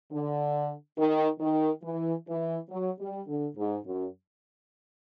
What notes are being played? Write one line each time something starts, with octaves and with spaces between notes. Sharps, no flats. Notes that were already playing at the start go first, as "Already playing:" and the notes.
D3
D#3
D#3
E3
E3
F#3
G3
D3
G#2
F#2